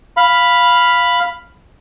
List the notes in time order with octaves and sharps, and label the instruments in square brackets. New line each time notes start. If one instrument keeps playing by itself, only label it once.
[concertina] F5 B5